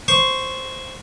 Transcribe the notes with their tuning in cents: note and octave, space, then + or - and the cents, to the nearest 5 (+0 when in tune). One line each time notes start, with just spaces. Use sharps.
C5 +0 C#6 +0